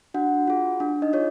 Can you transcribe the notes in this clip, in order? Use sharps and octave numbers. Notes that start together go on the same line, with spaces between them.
D4 F#4 F#5
F4 G#4
D4
D#4 D#5
F4 G#4 C#5